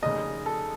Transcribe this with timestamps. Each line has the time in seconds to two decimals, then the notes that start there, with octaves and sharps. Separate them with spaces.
0.02 F1 D#2 C#3 D#5
0.46 A4